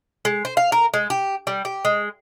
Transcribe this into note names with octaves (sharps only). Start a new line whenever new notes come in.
G#3
C5
F5
A#4
G#3
G4
G3
G4
G#3